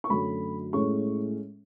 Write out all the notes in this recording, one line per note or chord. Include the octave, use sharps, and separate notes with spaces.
C#6
F#2 D3 F#3 A3 B5
A2 G#3 C#4 C#6